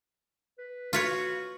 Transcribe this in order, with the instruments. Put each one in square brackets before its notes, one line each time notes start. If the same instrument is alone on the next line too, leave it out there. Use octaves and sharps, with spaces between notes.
[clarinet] B4
[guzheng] F4 B4 C#5 [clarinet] F#4